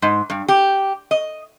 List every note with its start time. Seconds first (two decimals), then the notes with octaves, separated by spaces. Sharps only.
0.02 G#2
0.30 G2
0.48 G4
1.11 D#5